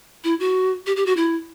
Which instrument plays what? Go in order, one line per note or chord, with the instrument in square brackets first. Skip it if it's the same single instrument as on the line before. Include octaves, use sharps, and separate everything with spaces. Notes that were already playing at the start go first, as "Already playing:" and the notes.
[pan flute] E4
F#4
G4
G4
F#4
E4